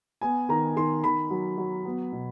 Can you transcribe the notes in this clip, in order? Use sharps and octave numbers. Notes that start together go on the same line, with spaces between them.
B3 G#5
D#3 A#5
D#3 C6
D#3 B5
F#3
F#3
B3
B2